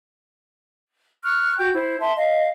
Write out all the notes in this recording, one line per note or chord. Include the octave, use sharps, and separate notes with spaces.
C#6 F6 F#6
F#4 G5 G6
E4 C5
E5 A5 C6
D#5 F5